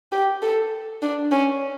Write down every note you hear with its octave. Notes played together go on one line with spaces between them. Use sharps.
G4
A4
D4
C#4